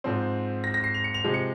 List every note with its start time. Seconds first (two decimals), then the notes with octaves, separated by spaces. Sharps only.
0.04 G#2 F3 C4
0.64 A#6
0.74 A#6
0.84 C7
0.94 F7
1.04 C#7
1.14 F7
1.24 C3 F3 G#3
1.34 C#7